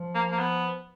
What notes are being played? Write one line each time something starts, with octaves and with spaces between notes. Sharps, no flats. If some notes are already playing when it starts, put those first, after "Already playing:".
Already playing: F3
A#3
A#3
B3